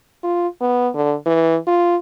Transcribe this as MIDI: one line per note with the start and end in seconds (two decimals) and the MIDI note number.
0.23 0.48 65
0.61 0.89 59
0.95 1.15 50
1.26 1.56 52
1.67 1.96 65